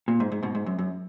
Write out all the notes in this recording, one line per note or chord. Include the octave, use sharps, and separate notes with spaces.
A#2
G#2
G#2
G#2 B2
G#2
F#2
F#2